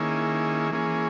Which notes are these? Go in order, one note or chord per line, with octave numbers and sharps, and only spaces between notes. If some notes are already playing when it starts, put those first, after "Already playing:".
Already playing: D#3 A#3 C#4 E4 G#4
E3 A#3 C#4 G#4